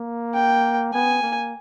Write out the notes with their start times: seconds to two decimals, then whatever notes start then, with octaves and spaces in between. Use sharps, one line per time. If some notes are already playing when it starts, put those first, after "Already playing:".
Already playing: A#3
0.34 G5
0.93 B3 G#5
1.23 A#3